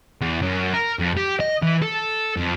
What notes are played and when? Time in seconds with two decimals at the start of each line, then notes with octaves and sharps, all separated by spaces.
0.22 E2
0.42 F#2
0.73 A#4
0.99 F2
1.17 G4
1.40 D#5
1.62 E3
1.82 A4
2.37 F2